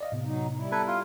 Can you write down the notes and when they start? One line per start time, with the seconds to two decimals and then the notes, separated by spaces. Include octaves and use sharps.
0.01 D5 D#5 F5
0.12 A2 C3 B3
0.25 F#3 D#4
0.57 G3 E4
0.72 B3 A4 B4 A#5 G#6
0.87 F4